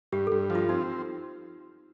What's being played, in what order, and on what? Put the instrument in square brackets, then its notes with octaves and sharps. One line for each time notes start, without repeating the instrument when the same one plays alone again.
[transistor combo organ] G2 [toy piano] G4
[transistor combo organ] G2 [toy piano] A4
[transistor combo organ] F3
[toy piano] F4
[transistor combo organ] C4 [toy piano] D#4